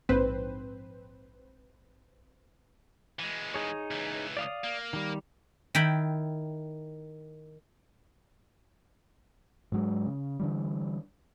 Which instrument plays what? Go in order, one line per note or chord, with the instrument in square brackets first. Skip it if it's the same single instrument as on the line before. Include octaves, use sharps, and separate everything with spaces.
[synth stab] A#1 G#2 C4 B4 C5
[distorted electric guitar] E3 G#3
[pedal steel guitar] D#4 G#4 C#5
[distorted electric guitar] C#2 E3
[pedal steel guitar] D5 F5 D#6
[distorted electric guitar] A#3
[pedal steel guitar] D#3 G3
[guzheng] D#3 E4 G5 B5
[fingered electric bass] G#2 F#3 G#3
C#3
D3 E3 G3